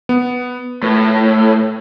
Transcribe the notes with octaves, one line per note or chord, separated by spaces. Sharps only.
B3
A2 A3 B4